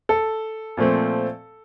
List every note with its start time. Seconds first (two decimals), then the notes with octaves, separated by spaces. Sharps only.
0.09 A4
0.77 A#2 F3 A3 C4